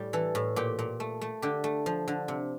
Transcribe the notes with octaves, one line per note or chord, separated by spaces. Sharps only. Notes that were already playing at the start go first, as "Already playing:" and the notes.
Already playing: A2 G3 A3
E3 A4
A2
A#2 G4
A#2
A3
A3
D3 G4
A3
F3
D3
C3